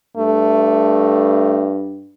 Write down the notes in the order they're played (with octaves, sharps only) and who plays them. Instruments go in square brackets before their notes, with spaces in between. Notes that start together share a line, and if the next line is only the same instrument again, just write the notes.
[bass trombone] G2 [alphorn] A3